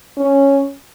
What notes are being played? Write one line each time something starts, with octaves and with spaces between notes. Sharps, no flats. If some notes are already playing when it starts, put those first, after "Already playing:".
C#4